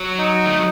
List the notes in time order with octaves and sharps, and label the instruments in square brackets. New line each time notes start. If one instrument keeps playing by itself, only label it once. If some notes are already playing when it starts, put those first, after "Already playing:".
Already playing: [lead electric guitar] F#3
[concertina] D#4
[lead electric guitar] A3